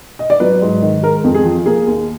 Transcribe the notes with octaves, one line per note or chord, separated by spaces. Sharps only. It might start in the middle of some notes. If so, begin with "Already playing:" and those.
D#5
D5
F#3 B4
G#2
D#3
G#3 A#4
F2
G#4
F3
A#3 G#4
D#2